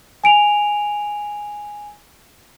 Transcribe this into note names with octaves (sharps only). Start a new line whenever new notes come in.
G#5 D7 F7